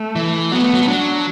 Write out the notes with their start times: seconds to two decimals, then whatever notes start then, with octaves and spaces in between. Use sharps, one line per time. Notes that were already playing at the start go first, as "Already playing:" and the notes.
Already playing: A3
0.16 E3
0.52 F#3 B3
0.63 A3
0.74 F#3
0.82 A3
0.88 F#3 D4